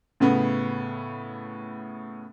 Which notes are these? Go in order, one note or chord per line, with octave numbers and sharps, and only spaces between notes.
A2 C#3 B3